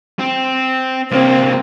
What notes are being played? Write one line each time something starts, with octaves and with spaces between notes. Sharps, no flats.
C4
C2 A#3 C4